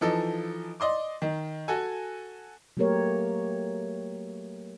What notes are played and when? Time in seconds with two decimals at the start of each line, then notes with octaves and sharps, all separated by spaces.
0.01 E3 F3 D#4 A4
0.80 D5 D#5 C6 D6
1.22 D#3
1.68 F#4 A4 G#5
2.77 F#3 A3 A#3 G4 A#4 C#5